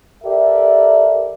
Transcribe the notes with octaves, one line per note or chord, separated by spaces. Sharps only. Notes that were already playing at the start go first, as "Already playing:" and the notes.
G4 A4 A#4 D5 E5